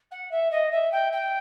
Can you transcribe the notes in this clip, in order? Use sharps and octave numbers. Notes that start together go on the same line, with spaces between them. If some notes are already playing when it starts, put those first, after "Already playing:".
F#5
E5
D#5
E5
G5
G5